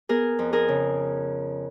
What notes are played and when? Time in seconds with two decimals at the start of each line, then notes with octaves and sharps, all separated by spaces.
0.09 B3 G#4 A#4
0.39 F2
0.53 G#4 A#4
0.68 C#3